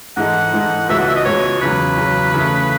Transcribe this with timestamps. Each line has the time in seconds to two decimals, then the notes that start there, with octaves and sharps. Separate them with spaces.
0.17 G#2 E3 G#3 D#4 A4 F#5
0.53 G#2 E3 G#3 D#4 A4
0.89 C#2 B2 G#3 B3 E5
0.99 F#5
1.08 E5
1.16 D#5
1.25 C#2 B2 G#3 B3 C#5
1.62 E2 C#3 F#3 B4
1.98 E2 C#3 F#3
2.34 C#3 E3 A3